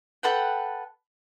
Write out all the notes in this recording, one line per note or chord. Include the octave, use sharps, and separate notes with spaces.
A4 B4 F#5 G5